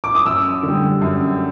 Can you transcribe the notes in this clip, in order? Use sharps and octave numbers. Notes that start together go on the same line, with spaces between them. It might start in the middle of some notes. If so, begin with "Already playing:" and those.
D6
D#6
F#2 E6
D3 G3
F#2